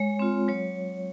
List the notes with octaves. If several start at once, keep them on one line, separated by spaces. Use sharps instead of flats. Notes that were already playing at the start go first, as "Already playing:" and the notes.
Already playing: G#3 C#5
C4 F4
F#3 C#5